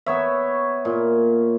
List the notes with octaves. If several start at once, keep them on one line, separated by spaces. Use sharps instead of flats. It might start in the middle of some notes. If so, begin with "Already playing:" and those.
B3 C#5 E5
A#2